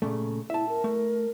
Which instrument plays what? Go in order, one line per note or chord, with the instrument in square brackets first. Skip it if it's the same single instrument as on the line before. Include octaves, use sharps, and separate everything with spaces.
[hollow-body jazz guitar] A#2 C#3 A3
[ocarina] E4 [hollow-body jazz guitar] E5 A5
[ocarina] A#4
[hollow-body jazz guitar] A3